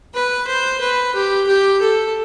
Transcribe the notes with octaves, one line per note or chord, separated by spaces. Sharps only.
B4
C5
B4
G4
G4
A4